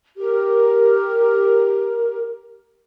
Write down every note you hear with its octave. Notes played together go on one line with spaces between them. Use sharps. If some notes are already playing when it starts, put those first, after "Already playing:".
G4 A#4